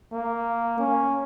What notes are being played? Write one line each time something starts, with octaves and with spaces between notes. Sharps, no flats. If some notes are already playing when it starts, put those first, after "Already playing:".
A#3
C#4